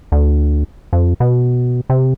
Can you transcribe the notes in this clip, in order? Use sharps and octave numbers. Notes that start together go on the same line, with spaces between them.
D2
F2
B2
C3